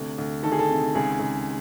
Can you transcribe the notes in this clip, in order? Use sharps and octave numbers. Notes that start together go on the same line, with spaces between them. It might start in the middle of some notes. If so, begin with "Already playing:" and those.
Already playing: D2 C3
D2
D#3 A4
G#4
A4
C3
C#2 G#4
C#2